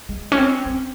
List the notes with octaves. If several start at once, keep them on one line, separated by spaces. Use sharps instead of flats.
G#3
C#4
C4
C4